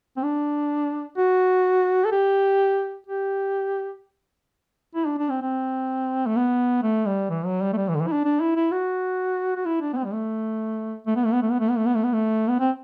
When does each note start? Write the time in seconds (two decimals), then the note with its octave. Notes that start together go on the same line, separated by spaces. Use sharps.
0.17 C4
0.23 D4
1.18 F#4
2.05 A4
2.12 G4
3.07 G4
4.95 E4
5.06 D4
5.18 D4
5.30 C4
5.42 C4
6.27 A3
6.37 B3
6.83 A3
7.06 G3
7.30 E3
7.45 F#3
7.62 G3
7.73 A3
7.77 G3
7.89 E3
7.95 D3
8.01 E3
8.07 E4
8.12 D4
8.25 D4
8.41 E4
8.56 E4
8.72 F#4
9.56 F#4
9.66 E4
9.81 D4
9.93 B3
9.97 C4
10.05 G3
10.13 A3
11.07 A3
11.16 B3
11.25 A3
11.33 B3
11.42 A3
11.51 B3
11.60 A3
11.69 B3
11.77 A3
11.86 B3
11.95 A3
12.04 B3
12.13 A3
12.48 B3
12.60 C4